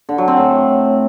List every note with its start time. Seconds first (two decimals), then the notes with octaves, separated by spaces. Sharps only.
0.09 D3
0.18 F#3
0.28 C4
0.37 A2